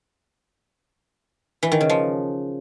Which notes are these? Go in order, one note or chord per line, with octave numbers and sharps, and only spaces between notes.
E3
D#3
C#3
F3